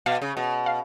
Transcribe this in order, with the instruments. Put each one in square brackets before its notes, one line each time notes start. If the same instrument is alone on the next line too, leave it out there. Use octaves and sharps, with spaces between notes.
[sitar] B2 [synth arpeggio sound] F5
[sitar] C#3
B2
[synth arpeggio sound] F5